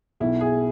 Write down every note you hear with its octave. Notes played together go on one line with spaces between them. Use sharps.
B1 B2 E4
G#4